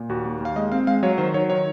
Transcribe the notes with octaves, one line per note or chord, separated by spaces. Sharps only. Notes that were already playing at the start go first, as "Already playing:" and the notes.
Already playing: A#2
D#2 F#4
A#3
D#2 F5
G#3 D#5
C4 F5
G#3 F5
F#3 C#5
D#3 C5
F#3 C#5
D#3 C#5